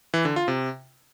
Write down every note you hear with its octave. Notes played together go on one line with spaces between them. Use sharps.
E3
D3
F4
C3